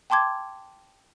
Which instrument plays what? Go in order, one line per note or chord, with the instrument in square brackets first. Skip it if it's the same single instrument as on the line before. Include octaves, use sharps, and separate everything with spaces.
[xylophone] G5 A5 C6 D6 G#6